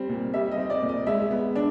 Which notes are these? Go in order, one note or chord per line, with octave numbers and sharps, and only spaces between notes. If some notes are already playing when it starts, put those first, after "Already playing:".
Already playing: G3 C4
A#2
G3 E5
D#5
C4
D5
A#2
D#5
G#3 E5
B3
D4